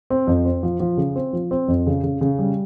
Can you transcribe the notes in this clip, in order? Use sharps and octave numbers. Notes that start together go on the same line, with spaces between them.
C4
F2
C4
F3
F3
C#3
C4
F3
C4
F2
C#3
C#3
C#3
G3